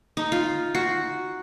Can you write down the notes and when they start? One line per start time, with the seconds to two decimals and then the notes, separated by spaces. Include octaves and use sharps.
0.17 D#4
0.32 F4
0.75 F#4